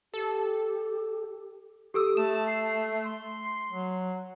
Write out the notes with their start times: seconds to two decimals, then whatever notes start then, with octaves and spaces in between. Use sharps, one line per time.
0.14 G4 A4
1.94 G4 A4 D#6 E6
2.17 A3 A5 E7
2.47 C7
3.04 C6
3.71 F#3